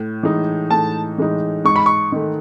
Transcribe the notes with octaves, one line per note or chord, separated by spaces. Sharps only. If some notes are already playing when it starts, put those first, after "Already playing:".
Already playing: A2
E3 G#3 D#4
A2 A5
E3 G#3 D#4
G#2 C#6
B5
C#6
D#3 A3